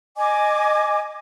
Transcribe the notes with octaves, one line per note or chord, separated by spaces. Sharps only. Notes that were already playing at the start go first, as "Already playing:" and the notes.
D#5 G#5 D6